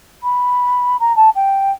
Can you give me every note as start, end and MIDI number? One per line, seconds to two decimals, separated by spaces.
0.23 0.97 83
1.00 1.16 82
1.16 1.30 81
1.35 1.72 79